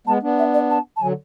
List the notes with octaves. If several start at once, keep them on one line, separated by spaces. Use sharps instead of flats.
G#3 B3 A5
B3 D4
E5
D5
A5
A5
D3 F#3 G#5